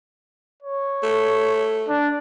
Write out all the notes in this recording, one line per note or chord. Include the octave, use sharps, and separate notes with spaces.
C#5
A3
D4